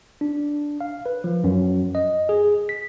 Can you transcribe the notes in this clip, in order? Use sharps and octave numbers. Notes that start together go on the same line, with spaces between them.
D4
F5
B4
F3
F#2
D#5
G#4
B6